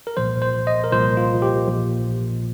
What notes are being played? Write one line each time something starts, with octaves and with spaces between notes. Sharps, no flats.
A#4
C2 A#2 F3 C5
C5
D#5
A#4
C2 A#2 F3 C5
F4
G4
A#1 A#2 F3